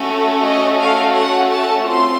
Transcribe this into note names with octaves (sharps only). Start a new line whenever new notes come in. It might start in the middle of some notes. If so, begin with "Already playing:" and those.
Already playing: A3 C#4 F#4 A4
D#5
F5
F#5
A5
A3 C4 F4 A4 C6